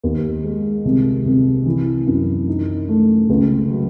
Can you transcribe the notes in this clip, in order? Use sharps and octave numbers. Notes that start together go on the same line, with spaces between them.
D#2
G#3
C2
C2
E3
F#2
D#4
A3
C#2
F#3